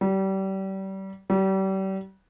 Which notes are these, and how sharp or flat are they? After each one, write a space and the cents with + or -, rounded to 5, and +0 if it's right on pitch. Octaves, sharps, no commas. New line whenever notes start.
G3 -30
G3 -35